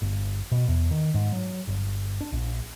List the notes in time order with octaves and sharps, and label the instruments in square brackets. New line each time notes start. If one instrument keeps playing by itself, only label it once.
[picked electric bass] G1
B2
E2
D#3
G#2
F#3
G1
D4
A#1